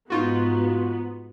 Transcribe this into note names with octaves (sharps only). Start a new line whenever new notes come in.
G#2 B3 D#4 F4 F#4